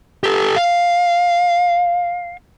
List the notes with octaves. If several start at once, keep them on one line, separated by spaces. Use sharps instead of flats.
G4 A4
F5